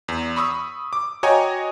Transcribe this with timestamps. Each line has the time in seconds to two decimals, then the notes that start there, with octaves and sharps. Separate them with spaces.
0.08 E2
0.36 B5 C#6 D#6 E6
0.93 D6
1.23 F#4 C#5 D#5 G5 G#5 A#5